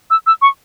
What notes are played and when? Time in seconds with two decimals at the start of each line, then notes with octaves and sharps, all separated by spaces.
0.10 E6
0.27 E6
0.42 C#6